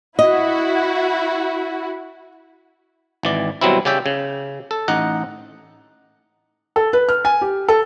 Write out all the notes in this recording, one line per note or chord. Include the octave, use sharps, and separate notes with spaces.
E4 F#4 D#5
G#1 E3 D5
B2 F#3 G3 C4 E4
C#3 C#4 G4 D5 E5 G5
C#3
A4
A1 D#4 D#5 F#5
A4
B4
F6
G#5
G4
A4